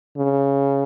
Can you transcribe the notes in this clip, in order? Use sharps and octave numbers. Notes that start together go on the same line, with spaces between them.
C#3